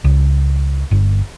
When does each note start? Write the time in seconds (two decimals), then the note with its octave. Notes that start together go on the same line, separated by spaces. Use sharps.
0.04 C#2
0.91 G1